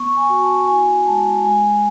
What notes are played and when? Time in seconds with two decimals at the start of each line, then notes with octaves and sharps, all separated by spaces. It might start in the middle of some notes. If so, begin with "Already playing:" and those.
Already playing: B3 C#6
0.17 G#5
0.29 F#4
0.42 A5
0.68 E4 G#5
0.99 G#5
1.06 G#3 A5
1.44 G#3 G#5